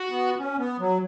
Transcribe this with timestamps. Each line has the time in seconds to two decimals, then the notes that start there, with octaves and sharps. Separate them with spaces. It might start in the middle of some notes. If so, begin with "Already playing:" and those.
Already playing: F#4
0.10 B3
0.38 C#4
0.58 B3
0.79 F#3